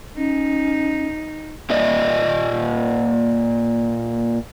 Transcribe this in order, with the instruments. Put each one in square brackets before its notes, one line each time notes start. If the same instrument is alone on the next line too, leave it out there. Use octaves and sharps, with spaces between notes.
[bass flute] C#4 [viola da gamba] D#4
[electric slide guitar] A#2 A#3 D5 D#5